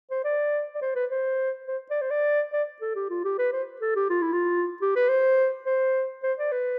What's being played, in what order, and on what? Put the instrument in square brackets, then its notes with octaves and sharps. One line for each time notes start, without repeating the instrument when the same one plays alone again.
[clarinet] C5
D5
D5
C5
B4
C5
C5
D5
C5
D5
D5
A4
G4
F4
G4
B4
C5
A4
G4
F4
E4
F4
G4
B4
C5
C5
C5
D5
B4